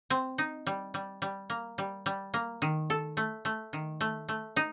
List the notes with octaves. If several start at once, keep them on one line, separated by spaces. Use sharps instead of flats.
C4
D#4
G3
G3
G3
A#3
G3
G3
A#3
D#3
A4
A3
A3
D#3
A3
A3
D#4